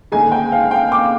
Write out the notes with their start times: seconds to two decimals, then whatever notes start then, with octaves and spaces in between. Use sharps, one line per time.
0.12 D#2 D3 G#3 G#5
0.32 G5
0.52 F5
0.71 G5
0.92 D6